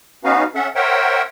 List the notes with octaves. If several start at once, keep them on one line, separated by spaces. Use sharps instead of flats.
B3 C#4 D#4 F#4 B4 F5
C#4 A4 E5 F#5
A#4 C5 C#5 E5 F#5 G5